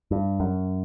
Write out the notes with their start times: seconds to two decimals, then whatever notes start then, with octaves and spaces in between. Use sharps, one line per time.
0.11 G2
0.40 F#2